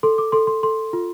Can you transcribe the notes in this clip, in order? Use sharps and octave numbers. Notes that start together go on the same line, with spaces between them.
A4 C6
D6
A4 C6
C6
A4 C6
F4